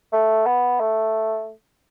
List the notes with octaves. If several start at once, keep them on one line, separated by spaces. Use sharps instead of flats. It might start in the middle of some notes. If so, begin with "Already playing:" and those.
A3
B3
A3